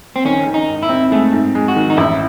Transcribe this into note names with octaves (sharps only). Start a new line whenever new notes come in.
C4
D#3 C#4
D#3
D#4
G#2
E4
C4
G#3 A3
G#2
G#3
F#4
D#3
D#4
A1 E4